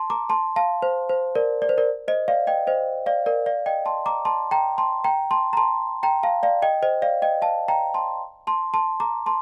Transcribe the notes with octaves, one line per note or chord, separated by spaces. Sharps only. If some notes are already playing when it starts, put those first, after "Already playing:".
Already playing: A5 C6
A#5 D6
A5 C6
F5 A5
C5
C5
A#4 D5
D5
C5
A#4 D5
C5 D#5
D5 F5
D#5 G5
C5 D#5
D5 F5
A#4 D5
D5 F5
D#5 G5
A5 C6
A#5 D6
A5 C6
G5 A#5
A5 C6
G5 A#5
A5 C6
A#5
A5 C6
G5 A#5
F5 A5
D5 F5
D#5 G5
C5 D#5
D5 F5
D#5 G5
F5 A5
G5 A#5
A5 C6
A5 C6
A5 C6
A#5 D6
A5 C6